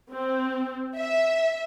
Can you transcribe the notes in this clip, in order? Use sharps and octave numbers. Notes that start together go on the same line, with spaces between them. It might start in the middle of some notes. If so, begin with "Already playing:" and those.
C4
E5